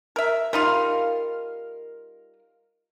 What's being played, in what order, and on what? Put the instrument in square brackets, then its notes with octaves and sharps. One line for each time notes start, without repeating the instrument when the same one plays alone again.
[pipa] A#4 E5
[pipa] G3 D#4 F4 [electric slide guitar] A#4 F5